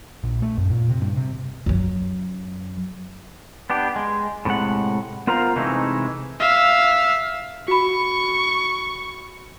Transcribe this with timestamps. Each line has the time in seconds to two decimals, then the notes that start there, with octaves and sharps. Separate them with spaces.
0.24 A#1
0.42 A3
0.58 F#2
0.70 A#2
0.89 C3
1.01 G2
1.16 C3
1.66 F#2 F#3
3.70 B3 D4 G4
3.96 G#3
4.45 A2 C3 D#3 G#3 F#5
5.27 B3 F4 A#4 C5 F5 A#5
5.56 C3 E3 G#3 A3 D#4
6.40 E5 F5
7.68 F#4 B5 C#6